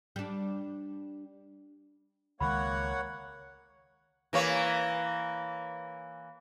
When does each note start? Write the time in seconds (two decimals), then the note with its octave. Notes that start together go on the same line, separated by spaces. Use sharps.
0.16 G3 D4
2.40 C#2 D#3 G#3 A#3 C#5 F#5 B5
4.33 E3 A#3 C#5